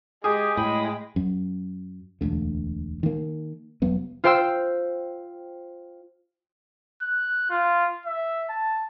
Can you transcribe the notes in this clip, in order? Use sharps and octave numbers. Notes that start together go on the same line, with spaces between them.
G#3 G4 G#4
A2 G#3 G5 B5 D#6
F#2
E1 D2 D3
D#3 A#3
F1 F#3 B3
F4 C5 G5 C6 E6
F#6
F4
E5
A5